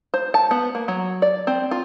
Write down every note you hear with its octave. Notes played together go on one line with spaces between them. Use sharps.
C5
A5
B3
A#3
F#3
D5
C4
F4